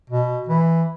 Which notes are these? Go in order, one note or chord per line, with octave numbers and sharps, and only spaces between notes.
B2
E3